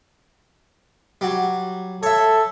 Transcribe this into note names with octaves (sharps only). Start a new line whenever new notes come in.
F#3 G3
A4 C#5 E5